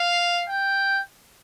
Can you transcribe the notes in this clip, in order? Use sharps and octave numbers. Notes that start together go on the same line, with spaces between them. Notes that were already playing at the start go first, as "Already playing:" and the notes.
Already playing: F5
G5